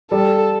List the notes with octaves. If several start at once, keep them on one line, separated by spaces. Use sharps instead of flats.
G3 A4